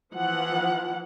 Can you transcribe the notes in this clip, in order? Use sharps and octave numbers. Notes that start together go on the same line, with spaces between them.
E3 F3 F#5